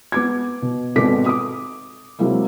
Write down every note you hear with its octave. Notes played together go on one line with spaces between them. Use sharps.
B3 D6 G#6
B2
G#1 B2 A4 D6 B6
D6 D#6
C3 F#3 G#3 A#3 E4